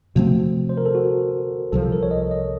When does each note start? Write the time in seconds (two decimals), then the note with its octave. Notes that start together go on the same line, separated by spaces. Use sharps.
0.15 C3 F3 A3 C4 F#4
0.69 C5
0.78 A#4
0.86 A4
0.95 F#4
1.72 C2 C3 F3 A4
1.92 A#4
2.03 C#5
2.11 D#5
2.31 D#5